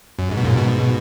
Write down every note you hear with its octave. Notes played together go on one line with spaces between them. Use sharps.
F#2
G#2
B2
F#2 A#2
G#2 B2